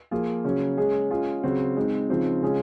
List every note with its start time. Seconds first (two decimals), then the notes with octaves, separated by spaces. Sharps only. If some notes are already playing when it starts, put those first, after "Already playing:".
0.11 F3 A#3 F4 G#4
0.44 C#3 F#3 C#4
0.77 G#3 C#4 G#4
1.10 G#3 C#4 F4 G#4
1.43 C#3 F#3 C4 F#4
1.76 G#3 C4 D#4
2.09 C#3 F3 C4 D#4
2.42 C#3 G#3 C#4 F4 G#4